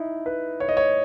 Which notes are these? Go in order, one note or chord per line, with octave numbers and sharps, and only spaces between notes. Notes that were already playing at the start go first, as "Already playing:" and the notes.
Already playing: D#4 E4
B4
C#5
D#5
C#5